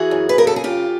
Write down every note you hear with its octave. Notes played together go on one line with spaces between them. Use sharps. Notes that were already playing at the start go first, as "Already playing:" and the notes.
Already playing: E3 F#4 G#4
F#2
B4
C#3 A#4
A4
G#4
F#2 F4 G4